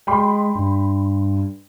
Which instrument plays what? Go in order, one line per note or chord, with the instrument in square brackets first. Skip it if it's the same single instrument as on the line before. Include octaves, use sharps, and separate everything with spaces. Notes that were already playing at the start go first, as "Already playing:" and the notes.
[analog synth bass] G#3 [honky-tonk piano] G5 B5 C6
[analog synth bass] G2